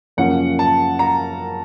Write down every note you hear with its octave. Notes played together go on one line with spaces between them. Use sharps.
F#2 C#3 F3 A#3 C#4 F#5
A5
A#5